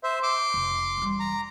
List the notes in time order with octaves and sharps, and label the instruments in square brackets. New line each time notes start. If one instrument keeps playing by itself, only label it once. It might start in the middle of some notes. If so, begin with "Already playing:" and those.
[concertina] C5 E5
C6 D6
[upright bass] F1
E3 G3
[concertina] A#5